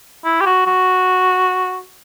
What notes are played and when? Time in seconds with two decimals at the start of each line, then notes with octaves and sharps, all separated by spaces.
0.25 E4
0.41 G4
0.46 F#4
0.67 F#4